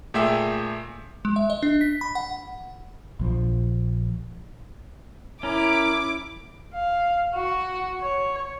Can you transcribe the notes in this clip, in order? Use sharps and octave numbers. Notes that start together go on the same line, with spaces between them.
A#2 A3 G#4 E5 G5 E6
G#3
E5
D#5
D4
B6
B5
F#5
A#1 F3
C#4 E4 A#4 D6
F5
F#4
C#5